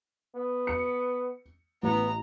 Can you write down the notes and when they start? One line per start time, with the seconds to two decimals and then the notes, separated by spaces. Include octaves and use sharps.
0.35 B3
0.67 C#7
1.83 A1 B3 A#5